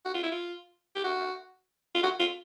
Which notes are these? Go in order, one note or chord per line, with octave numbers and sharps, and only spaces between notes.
F#4
F4
E4
F4
G4
F#4
F4
F#4
F4